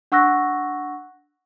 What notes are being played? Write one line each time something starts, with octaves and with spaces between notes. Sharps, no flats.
D4 F#5 C#6 E6 F#6 A#6